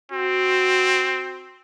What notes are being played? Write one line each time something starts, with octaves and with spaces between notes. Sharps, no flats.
C4 F#4